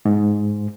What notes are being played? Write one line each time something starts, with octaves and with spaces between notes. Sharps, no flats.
G#2